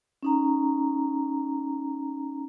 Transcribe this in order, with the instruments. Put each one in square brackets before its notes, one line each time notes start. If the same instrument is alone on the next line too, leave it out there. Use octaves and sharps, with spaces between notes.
[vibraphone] C#4 D#4 A#5